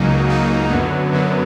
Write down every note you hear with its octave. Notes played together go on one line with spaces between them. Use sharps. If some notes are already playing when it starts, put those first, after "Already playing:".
Already playing: C#2 C#3 F#3 A#3 D#4
C#2 C#3 F#3 A#3 D#4
F#2 D3 F#3 B3
F#2 D3 F#3 B3